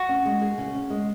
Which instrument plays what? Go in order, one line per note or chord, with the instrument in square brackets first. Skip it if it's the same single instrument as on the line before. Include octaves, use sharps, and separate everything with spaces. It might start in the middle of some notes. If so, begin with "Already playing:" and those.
Already playing: [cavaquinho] F#4
[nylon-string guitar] C#4
G#3
G#4
C#3
C#4
G#3